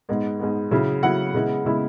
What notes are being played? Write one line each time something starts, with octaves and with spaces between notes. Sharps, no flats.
G#2 G#3 B3
G#2 G#3 B3
C#3 F#3 E4
C#3 F#3 E4 F#5
C#3 G#3 B3 E4
C#3 G#3 B3 E4